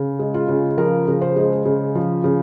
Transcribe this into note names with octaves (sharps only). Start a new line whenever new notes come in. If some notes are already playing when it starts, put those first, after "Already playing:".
Already playing: C#3
G#3
F4
C#3
F3 A#4
C#3
C5
G#3
C#3
F3
C#3